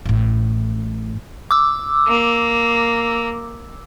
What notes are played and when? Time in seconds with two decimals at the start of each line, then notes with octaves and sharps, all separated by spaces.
0.06 A1 A2
1.51 D6 E6
2.08 A#3